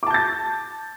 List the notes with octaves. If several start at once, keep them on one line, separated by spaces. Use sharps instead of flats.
A5 D6 G6 A6